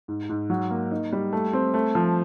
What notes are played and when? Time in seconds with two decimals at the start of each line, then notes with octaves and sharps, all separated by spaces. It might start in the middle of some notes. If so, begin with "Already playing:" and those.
0.08 G#2
0.29 G#2
0.50 F#3
0.71 A#3
0.91 D#4
1.12 G3
1.33 A3
1.53 C4
1.74 A3
1.95 F3